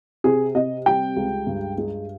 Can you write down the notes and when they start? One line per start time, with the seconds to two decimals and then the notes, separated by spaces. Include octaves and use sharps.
0.24 C3 G#4
0.55 C3 D#5
0.86 G3 G5
1.17 C#2
1.47 G2
1.78 G#3